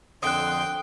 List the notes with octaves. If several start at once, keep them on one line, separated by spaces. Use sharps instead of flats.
F2 D3 G5 C6 D#6 F#6